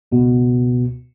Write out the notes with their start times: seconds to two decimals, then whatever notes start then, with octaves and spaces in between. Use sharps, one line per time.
0.12 C#2 B2